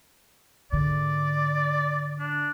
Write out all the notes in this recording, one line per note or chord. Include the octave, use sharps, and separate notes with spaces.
G#2 D3 D5
D4